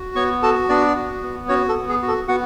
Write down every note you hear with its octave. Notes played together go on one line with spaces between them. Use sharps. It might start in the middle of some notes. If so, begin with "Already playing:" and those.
Already playing: F#4
B3 C#5 C#6
F#4 A4 A5
B3 D4 D5
F#4
B3
C#4 F#4 C#5
A4
B3
G#4
F#4
A4
B3 F#4 F#5